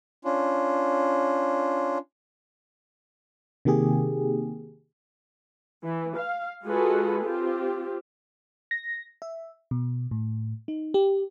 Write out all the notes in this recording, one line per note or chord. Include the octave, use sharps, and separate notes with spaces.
C#4 D4 F4
C3 D#3 A#3 G4 G#4
E3
F5
G#3 F4 F#4 G#4 A4 B4
C4 F4 G4
A#6
E5
B2
A2
D#4
G4